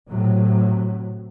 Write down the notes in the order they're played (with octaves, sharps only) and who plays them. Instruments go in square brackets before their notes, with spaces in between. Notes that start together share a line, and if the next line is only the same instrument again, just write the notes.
[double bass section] A2 C3 F#3